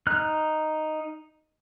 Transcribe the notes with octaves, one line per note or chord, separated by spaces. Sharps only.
D#4 F6 F#6